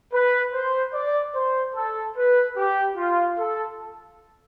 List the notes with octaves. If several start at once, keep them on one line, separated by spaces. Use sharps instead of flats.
B4
C5
D5
C5
A4
B4
G4
F4
A4